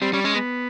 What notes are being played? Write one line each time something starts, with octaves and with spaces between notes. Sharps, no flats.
G3 C4
G3 C#4
G#3 C#4
B3